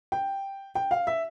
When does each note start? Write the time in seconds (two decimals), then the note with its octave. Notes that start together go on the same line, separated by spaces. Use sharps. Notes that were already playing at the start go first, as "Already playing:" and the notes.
0.12 G5
0.75 G5
0.91 F5
1.07 E5